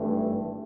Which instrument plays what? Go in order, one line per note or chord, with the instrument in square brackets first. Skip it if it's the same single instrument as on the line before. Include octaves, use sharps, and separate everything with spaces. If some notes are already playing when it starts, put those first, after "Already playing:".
Already playing: [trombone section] G#1 G2 E3 A3